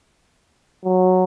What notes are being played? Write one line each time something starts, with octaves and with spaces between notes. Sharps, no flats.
F#3